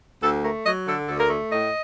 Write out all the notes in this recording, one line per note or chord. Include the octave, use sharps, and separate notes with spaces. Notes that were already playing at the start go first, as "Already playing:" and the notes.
D2 A4
A3 A#4
F#3 D#5
D3 A4
D2 A4
A#4
A3
A2 D#5